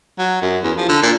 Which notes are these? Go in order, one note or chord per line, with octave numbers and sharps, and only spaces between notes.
F#3
F#2
E2
F3
D3
A#2